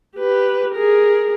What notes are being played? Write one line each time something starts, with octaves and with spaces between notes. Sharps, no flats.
G4 B4
G#4 A#4